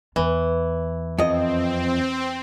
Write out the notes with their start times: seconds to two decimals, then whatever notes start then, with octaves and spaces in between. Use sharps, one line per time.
0.16 E2 E3
1.18 F2 C4 D#5